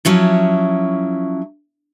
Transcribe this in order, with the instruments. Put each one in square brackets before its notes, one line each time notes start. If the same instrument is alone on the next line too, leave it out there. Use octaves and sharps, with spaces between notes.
[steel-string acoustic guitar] F3 F#3 C#4 E4